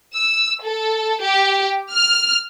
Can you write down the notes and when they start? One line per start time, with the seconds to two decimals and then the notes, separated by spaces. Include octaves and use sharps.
0.16 E6
0.63 A4
1.22 G4
1.92 F6